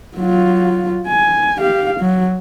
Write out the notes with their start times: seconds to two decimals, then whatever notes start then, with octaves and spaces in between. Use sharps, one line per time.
0.16 F#3 F4
1.07 G#5
1.58 G4 F5
2.00 F#3